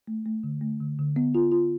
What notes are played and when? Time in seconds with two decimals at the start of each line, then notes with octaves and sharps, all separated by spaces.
0.07 A3
0.26 A3
0.44 D3
0.61 A3
0.81 D3
0.99 D3
1.16 B3
1.35 F4
1.52 F4